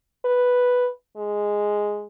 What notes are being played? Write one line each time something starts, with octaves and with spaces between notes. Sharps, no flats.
B4
G#3